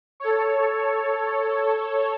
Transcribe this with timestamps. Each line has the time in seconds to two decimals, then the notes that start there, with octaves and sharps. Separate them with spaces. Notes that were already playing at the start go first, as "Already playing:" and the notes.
0.20 A4 C#5